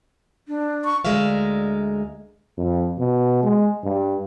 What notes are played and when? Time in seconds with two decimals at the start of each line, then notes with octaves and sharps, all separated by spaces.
0.48 D4
0.85 C#6
1.05 D2 D3 G#3 A#4 E5 F5
2.58 F2
2.98 B2
3.43 G#3
3.83 G2